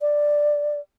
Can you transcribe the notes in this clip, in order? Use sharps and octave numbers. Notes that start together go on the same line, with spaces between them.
D5